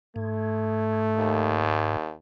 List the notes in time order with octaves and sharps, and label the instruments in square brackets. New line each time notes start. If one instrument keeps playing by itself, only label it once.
[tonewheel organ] G#2 [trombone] A3
[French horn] D#2